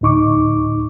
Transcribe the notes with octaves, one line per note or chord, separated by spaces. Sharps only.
D2 A2 D#4 C#6 D6